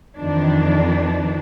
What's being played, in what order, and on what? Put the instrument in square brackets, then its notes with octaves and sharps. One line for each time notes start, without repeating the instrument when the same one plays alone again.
[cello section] F2 D#3 E3 D4